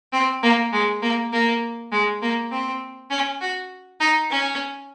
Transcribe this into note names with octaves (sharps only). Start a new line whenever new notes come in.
C4
A#3
G#3
A#3
A#3
G#3
A#3
C4
C#4
F#4
D#4
C#4